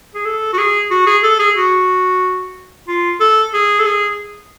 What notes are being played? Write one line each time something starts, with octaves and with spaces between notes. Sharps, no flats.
G#4
A4
F#4
G#4
F#4
G#4
A4
G#4
F#4
F4
A4
G#4
A4
G#4